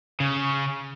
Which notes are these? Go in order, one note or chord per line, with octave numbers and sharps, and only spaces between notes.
C#3